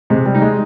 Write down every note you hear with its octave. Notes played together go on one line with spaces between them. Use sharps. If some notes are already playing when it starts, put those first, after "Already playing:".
C3 G#3
G3
D#4
G#3